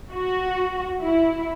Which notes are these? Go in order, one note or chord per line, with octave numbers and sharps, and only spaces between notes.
F#4
E4